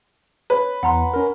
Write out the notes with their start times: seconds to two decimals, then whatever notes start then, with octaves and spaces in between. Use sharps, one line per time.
0.50 B4 C#5
0.83 E2 F#5 A#5 C6
1.14 C#4 A#4